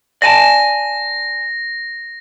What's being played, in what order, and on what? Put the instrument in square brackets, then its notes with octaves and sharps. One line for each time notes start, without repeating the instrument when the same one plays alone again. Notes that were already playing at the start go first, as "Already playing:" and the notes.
[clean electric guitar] D5 G#5 A5 [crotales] A#6